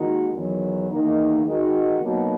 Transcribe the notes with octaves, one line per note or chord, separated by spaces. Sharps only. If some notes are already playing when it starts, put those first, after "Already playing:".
Already playing: D#2 D#3 G#3 D#4 F#4
E2 D#3 F#3
E2 D#3 A#3 D#4
D#3 G#3 D#4 F#4
B2 F#3 A#3 D#4 F#4